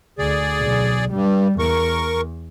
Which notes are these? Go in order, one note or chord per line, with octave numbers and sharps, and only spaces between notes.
D2 G#4 D5
B1
G2 G3
E2 A#4 C#6